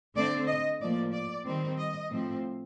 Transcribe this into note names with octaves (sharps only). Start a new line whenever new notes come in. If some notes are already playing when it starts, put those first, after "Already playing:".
D3 A3 C4 D5
D#5
A2 F3 A#3 D5
D5
D#3 G3 C4
D#5
A2 F3 C4